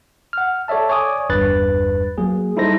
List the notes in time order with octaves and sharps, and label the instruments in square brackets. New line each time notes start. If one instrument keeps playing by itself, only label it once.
[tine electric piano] F#5 F6
A4 C#5 D5 E5 A5
C#5 D5 G#5 D6 D#6
G1 E2 G2 B4 F#6 A6
F#3 A#3 G#4
G3 D#4 E4 A4 C5 A#6